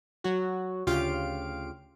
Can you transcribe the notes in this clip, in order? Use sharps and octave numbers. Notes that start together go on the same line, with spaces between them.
F#3 F#4
D2 C#3 F4 G4 F5 D7